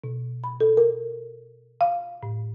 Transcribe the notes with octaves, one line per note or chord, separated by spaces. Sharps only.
B2
B5
A4
A#4
F5
A2